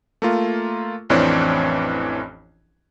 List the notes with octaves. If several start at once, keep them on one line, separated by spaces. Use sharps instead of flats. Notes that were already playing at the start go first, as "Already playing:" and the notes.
A3 A#3 F4
A1 F2 E3 C4 D4 C#5